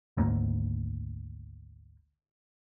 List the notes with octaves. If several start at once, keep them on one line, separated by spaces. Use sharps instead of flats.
G#1 D2 G#2 A#3